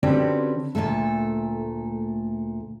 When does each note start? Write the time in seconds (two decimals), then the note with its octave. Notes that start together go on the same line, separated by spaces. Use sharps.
0.03 D3 C4 C#4 F#4 G4 B4
0.75 D2 G2 A#2 A3 A4